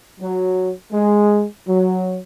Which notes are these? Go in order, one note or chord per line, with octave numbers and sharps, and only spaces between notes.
F#3
G#3
F#3